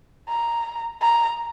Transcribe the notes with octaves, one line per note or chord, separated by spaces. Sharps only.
A#5
A#5